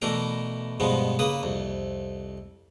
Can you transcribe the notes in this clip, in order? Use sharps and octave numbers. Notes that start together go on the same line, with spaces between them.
B2 E3 A3 D4 A#4 A#5
G2 B2 F3 G#3 B3
C#3 A#3 B4 D#6
C2 F2